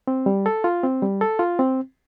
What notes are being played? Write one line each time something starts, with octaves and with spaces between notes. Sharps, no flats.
C4
G3
A4
F4
C4
G3
A4
F4
C4